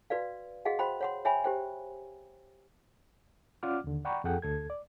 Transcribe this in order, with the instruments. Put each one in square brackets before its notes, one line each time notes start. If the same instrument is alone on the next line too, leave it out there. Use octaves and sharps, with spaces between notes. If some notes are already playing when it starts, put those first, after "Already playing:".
[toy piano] F#4 B4 D5 F5
F#4 G#4 D#5 F5 F#5
F#4 C5 G5 B5 C6
C#5 F#5 C6
C#5 E5 G5 G#5 B5
G4 C5 G5
[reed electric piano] C#4 F4 D5 F#5 D6 F6
D#2 D3
D5 F#5 G5 A#5 B5 C#6
F2 F3 G#4 A4 F#5 G5
D2 A4 G#6
D5